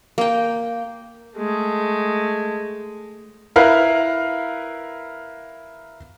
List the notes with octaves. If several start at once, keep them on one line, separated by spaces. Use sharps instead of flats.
A#3 G5
G#3 A3
E4 A#4 B4 F5